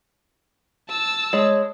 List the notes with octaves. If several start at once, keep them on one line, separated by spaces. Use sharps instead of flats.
A5 E6
G#3 C#5